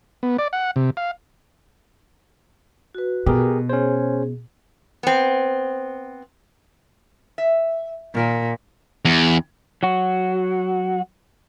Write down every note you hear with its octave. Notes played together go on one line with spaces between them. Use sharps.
B3
D5
F#5
C3
F5
F#4 B4
B2 G4 G#4 A#4
C#4 G#4 C5
B3 C4
E5
A#2 D#3 A#4 A5
E2
F#3 F#4